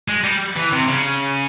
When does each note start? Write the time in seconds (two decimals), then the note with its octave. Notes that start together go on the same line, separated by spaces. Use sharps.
0.08 G#3
0.24 G3
0.56 E3
0.72 C3
0.88 C#3